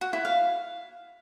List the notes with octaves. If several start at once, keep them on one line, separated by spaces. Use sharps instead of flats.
F#4
E4
F5